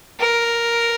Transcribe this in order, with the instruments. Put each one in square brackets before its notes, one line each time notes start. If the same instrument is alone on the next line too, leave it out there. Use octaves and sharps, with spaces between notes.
[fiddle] A#4